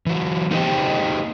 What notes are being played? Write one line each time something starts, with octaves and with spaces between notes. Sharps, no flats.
E3 F#3
A#3 D#4 G4 C5 D#5 G5